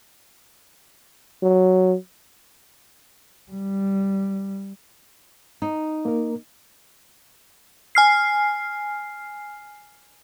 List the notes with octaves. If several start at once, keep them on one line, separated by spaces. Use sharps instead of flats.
F#3
G3
D#4
A#3 A#4
G#5 F6 C7